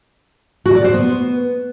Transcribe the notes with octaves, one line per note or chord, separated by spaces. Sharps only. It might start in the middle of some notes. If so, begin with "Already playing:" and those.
F#4
D5
C5
B3